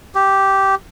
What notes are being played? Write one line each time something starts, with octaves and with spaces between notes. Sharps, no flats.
G4